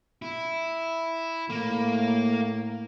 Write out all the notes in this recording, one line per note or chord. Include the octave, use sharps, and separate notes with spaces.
E4
A2 A#3